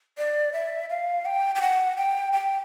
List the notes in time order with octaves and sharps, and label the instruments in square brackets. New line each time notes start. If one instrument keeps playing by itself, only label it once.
[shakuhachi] D5
E5
F5
G5
G5
F#5
G5
G5